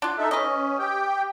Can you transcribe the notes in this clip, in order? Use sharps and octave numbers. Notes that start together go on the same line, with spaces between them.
D4 F4
D#4 A4 E5
C#4 B4 D#5
G4 G5